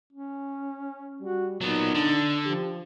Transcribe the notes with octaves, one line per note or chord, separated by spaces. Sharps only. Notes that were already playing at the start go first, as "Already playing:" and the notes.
C#4
G3 F#4
A#2 F#3 B3 D#4
D3 D4
F3 G4